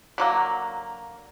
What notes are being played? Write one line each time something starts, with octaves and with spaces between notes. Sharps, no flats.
D3 F#3 A#3